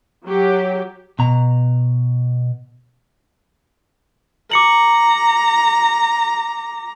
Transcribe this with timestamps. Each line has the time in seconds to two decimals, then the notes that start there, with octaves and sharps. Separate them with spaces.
0.25 F#3 G4
1.19 B2 A#5
4.52 A#5 D6 C#7 F#7